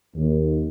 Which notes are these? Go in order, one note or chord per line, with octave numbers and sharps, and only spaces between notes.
D#2